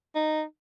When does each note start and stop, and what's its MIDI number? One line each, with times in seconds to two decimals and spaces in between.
0.15 0.43 63